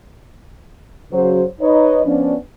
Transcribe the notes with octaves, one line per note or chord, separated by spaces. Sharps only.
C#3 F#3 C5
D#4 B4 C#5 D#5
F3 B3 C#4 D4